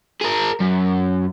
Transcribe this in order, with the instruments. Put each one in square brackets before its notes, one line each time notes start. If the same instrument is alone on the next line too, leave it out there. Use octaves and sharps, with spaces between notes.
[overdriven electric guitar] G#4 A#4
F#2